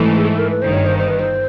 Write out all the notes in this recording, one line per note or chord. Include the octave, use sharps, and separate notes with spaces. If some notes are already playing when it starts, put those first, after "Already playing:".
Already playing: G#2 E3 A3
G#4
A4
A#4
B4
G1 G2 D#3 C5
C#5
C5
C5
B4
C5